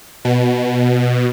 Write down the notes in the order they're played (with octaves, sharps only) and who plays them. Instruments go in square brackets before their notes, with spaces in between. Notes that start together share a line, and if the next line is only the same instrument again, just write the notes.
[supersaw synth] B2